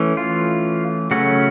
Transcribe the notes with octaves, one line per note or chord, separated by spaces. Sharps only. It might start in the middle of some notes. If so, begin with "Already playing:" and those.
Already playing: E3 A3 C#4
F4
C#3 F#3 A3 C#4 F#4